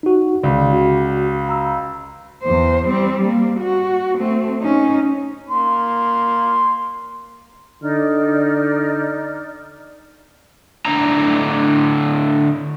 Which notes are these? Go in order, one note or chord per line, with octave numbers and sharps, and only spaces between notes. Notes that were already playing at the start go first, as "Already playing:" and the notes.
D#4 F#4
C#2 D5
F#4
A#5 E6
E2 C5
G3 C4
A#3
F#4
A3 C4
C#4 D#4
A#3 C6
D3 D#4 D5 F6
A2 D3 D4 E4 A#5